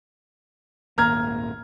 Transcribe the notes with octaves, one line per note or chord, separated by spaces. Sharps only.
D#1 G#1 A#3 A#5 F6 G#6